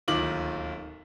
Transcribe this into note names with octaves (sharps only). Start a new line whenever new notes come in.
D1 D#2 D#3 F4 D6 F#7